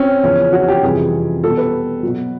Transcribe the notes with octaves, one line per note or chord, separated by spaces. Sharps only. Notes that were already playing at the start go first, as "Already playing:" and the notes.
Already playing: C4 C#4
E2 C#3 F3 C#4
F#4
G4
F2 C3 E3 G3 G#4
B2 G3 A4
B4
B2 F#3